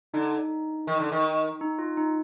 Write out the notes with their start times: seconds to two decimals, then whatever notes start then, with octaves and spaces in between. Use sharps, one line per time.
0.14 D3 D#4
0.87 D#3
1.00 D3
1.12 D#3
1.61 D#4
1.79 F4
1.97 D#4